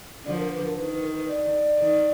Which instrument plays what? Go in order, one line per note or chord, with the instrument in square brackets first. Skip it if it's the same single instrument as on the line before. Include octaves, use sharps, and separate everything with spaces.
[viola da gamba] D3 F3 [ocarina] D5
[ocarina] B4
A#4
B4
A#4
[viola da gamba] D#3 [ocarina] B4
[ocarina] B4
A#4
B4
D5
[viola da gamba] D#3